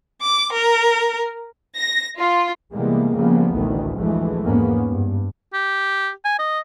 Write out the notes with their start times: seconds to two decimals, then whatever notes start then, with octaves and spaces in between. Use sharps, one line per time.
0.21 D6
0.52 A#4
1.76 A#6
2.18 F4
2.73 C3 E3 G3 G#3 A#3 B3
3.15 C#3 F3 G3 A#3 B3
3.52 A1 D2 D#3 E3
3.96 D2 E3 F3 G#3 A3
4.43 E2 G#2 A#3 B3 C#4
4.86 G2
5.54 G4
6.25 G#5
6.39 D#5